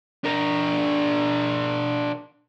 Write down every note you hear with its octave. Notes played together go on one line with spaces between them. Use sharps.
D4 A#4